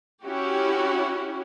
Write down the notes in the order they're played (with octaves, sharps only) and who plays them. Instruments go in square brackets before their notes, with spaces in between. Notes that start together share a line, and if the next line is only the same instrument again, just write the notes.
[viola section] C#4 E4 F#4 G4